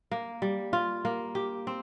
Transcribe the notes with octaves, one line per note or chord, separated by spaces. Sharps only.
A#3
G3
F4
A#3
G4
C4